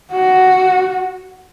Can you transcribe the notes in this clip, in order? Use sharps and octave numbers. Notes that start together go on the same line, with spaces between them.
F#4